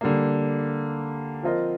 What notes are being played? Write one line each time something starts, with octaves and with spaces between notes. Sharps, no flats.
D3 G3 A#3
F3 C4 F4 A#4 D#5